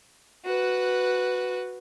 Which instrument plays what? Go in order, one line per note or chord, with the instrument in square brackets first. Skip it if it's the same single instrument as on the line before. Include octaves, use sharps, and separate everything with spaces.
[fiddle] F#4 B4